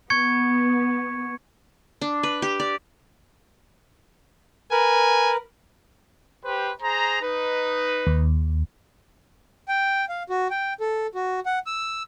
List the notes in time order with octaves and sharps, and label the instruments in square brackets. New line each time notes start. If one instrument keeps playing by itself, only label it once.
[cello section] B3 [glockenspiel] C#6 G#6 C#7
[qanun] D4
B4
G4
D5
[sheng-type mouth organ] A#4 B4 [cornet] G#5
[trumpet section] G4 B4 C5
G#4 C5 A#5
D#4 B4
[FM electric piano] D#2
[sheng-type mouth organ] G5
F5
F#4
G5
A4
F#4
F#5
E6